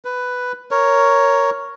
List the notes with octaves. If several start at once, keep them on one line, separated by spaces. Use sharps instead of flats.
B4
A#4 C#5